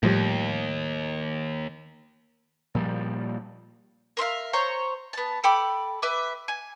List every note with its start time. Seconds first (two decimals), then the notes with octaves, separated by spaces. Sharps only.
0.03 D#2 A2 F3 G3
2.75 A#2 F3 G3
4.17 A#4 C5 E5 F5
4.53 C5 C#5 A#5
5.13 B3 A5
5.44 A4 G5 B5 D6
6.02 B4 E5 D6
6.48 G#5